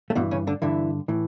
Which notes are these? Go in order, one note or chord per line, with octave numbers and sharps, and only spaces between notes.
A3
G2 B2 E3 B3
C#3 C#4
D3 D4
G2 D3 E3 E4
A2 E3